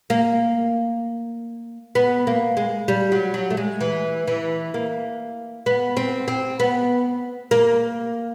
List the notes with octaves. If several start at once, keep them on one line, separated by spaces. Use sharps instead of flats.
A#3
B3
A#3
G#3
G3
F#3
F#3
A3
G#3
E3
E3
A#3
B3
C4
C4
B3
A#3